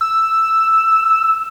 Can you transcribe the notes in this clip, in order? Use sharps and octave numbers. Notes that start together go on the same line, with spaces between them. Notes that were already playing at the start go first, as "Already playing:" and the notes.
E6